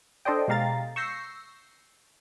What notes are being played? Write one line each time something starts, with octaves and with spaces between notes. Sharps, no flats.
D4 A4 C5 D5 D#5 G5
B2 G#3 G4 F5 A#5 A6
C#6 E6 G6 A#6 C7